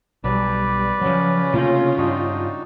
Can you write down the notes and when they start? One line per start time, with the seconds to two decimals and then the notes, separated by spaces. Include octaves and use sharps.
0.24 B1 G3 B4 D5
1.01 C#3 F3 F#3 C#4
1.54 C3 A3 A#3 F4
1.98 G2 D4 D#4 F#4